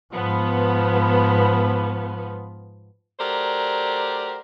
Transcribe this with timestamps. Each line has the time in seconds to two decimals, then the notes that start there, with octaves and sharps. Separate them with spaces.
0.14 G#2 F3 B3
3.20 F#3 A3 G4 A#4 C5 D5